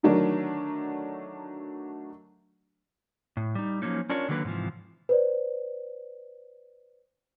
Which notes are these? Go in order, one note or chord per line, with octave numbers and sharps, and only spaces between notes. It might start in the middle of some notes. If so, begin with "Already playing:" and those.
D3 D#3 F#3 A3 D4 A#4
A2
G3 D#4
F3 F#3 A#3 C#4 D#4
C#4 D4 F4 A#4 C#5
D3 D#3 F#3 A#3 B4
G#2 C3 E3 F3
B4 C5 D5